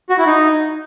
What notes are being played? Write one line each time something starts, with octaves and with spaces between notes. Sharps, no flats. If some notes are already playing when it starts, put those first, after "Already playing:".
F#4
E4
D#4